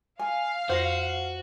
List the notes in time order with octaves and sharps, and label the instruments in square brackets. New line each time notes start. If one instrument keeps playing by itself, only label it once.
[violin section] F5 [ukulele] G#5
[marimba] F2 A#6 [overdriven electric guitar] F#4 [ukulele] C5